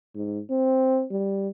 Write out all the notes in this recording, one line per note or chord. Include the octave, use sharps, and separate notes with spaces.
G#2
C4
G3